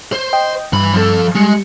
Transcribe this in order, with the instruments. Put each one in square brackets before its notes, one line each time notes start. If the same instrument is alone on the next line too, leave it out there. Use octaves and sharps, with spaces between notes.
[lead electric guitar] C5
[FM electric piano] D#5 G5
[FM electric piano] G2 [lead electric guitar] E3 B5
[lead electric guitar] F3 A4
[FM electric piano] G3 C#7 [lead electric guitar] G#3